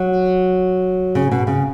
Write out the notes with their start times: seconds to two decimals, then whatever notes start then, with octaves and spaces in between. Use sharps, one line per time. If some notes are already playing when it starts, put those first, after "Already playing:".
Already playing: F#3
1.15 C#3
1.31 B2
1.47 C#3